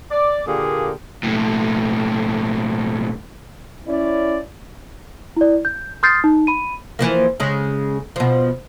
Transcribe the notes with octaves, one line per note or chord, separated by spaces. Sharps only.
D5
A#2 D3 A#3 G4 G#4
B1 A2
C#4 E4 D5
E4 D5
G6
C6 D#6 F6 G6 A6 C7
D#4
B5 D#7
E3 F3 A#3
C#3 G#3 C#4
B2 F3